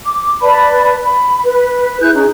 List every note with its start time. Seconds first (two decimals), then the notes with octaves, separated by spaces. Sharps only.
0.05 D6
0.42 B4 D5 A5 B5
1.04 B5
1.44 B4
2.00 E4 G#4 F#6 G6
2.14 C#4 D#4 G#4